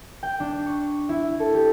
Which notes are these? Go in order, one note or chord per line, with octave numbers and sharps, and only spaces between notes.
G5
D4
C#6
E4
A4
G4